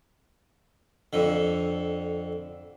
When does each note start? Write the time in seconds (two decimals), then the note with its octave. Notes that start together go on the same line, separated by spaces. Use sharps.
1.13 F2 D3